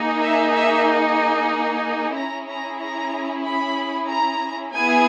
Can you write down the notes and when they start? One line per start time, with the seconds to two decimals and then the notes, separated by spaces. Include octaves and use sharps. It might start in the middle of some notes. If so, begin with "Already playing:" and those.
Already playing: A#3 D#4 G#4
0.22 E5
0.54 E5
2.16 C#4 E4 G#4 A#5
2.49 A#5
2.81 A#5
3.45 B5
4.10 A#5
4.75 B3 E4 G#4 G#5